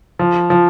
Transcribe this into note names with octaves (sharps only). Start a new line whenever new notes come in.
F3
F3